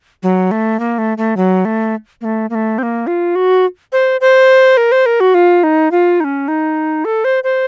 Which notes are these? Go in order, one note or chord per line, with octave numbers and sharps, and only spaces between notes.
F#3
A3
A#3
A3
A3
F#3
A3
A#3
A3
A#3
A3
C4
A#3
F4
F#4
C5
C5
A#4
C5
A#4
F#4
F4
D#4
F4
D#4
C#4
D#4
A4
C5
C5